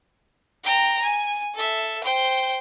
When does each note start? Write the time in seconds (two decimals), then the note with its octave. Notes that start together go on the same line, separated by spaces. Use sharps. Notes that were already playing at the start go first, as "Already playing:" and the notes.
0.64 G5 A#5
1.02 G#5
1.55 A4 E5
2.03 C5 G5